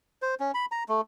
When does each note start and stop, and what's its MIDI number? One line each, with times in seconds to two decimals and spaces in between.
0.22 0.35 72
0.40 0.51 61
0.54 0.66 83
0.72 0.84 82
0.89 1.01 57